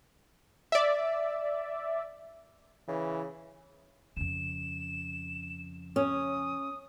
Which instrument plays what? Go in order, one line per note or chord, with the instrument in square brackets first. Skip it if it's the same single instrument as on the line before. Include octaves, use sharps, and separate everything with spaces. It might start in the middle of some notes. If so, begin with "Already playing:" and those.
[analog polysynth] D5 E5
[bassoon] C#3 [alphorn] E3
[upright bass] F2 C#3 [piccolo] E7
[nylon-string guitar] C#4 [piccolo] D#6